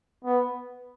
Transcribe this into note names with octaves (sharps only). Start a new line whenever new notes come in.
B3